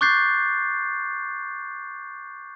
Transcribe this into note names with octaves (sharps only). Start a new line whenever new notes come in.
C#6 D6 F#6 G6 A6 C7